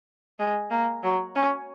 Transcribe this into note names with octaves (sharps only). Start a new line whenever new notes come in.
G#3
A#3
F#3
C#4